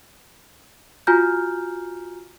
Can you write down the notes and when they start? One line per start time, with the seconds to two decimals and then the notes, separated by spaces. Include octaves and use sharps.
1.07 F4 F#4 G#5 A#5 F6 G6